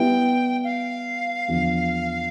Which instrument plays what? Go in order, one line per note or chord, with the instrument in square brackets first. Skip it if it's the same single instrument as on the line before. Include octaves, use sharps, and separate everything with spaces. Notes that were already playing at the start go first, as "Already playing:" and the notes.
Already playing: [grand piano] G3 B3 E4 [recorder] G5
[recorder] F5
[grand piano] E2 D3 F3